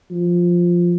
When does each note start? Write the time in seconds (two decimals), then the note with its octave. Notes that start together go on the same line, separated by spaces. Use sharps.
0.11 F3